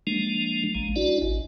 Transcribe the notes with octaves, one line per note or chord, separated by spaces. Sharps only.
F3 G#3 A#3 D4
A#1 G#3
D4 E4 F#4 D5
G#1